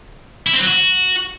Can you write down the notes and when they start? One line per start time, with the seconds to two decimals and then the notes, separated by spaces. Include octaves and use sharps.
0.47 E4
0.53 C4
0.60 F#3
0.67 F#4